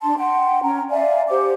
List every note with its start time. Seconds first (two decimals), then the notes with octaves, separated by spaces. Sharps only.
0.02 D4 A5 C6
0.19 F#5 G5 C6
0.63 C#4 G5 A#5
0.90 D5 E5 F5 G#5
1.29 G4 C5 F#5 D6